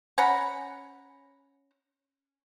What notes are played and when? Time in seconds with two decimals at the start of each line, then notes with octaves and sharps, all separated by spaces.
0.18 C#4 F#5 A#5 B5